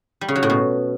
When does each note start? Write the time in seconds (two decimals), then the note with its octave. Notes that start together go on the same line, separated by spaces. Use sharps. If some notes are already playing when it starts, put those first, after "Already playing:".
0.21 G3
0.28 C#3
0.36 F#3
0.43 A2
0.50 B2